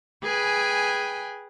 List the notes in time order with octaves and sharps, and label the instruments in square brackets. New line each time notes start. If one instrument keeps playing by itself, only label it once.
[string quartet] G#4 B4 G5 G#5